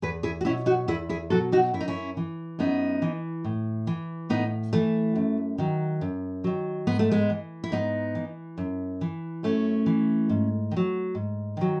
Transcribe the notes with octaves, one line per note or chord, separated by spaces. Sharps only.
E2 G#4 B4
E4 G#4
F#4
B2 F#3 C#4 E4
D#4 F#4
E2 E4 G#4
E4 G#4
B2 F#3 F#4 A4
D#4 F#4
F#2 E4
D#4
C#4 E4
E3
F#2 B3 D#4
E3
A2
E3
A2 B3 D#4
E3 A3
F#2
D#3 F#3
F#2
D#3 F#3
G#2 B3
A3
G#3 B3
E3
E4
G#2 B3 D#4
E3
F#2
E3
F#2 A3 C#4
E3
G#2
D#3
F#3
G#2
D#3 F#3